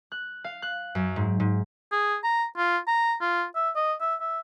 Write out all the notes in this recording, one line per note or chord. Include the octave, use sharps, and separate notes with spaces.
F#6
F5
F#6
F#2
G#2
G#2
G#4
A#5
F4
A#5
F4
E5
D#5
E5
E5